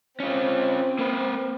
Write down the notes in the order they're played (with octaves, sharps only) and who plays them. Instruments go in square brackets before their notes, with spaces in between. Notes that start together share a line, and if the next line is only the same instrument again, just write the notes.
[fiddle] C4 [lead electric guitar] C#4 F4
[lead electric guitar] A#3 B4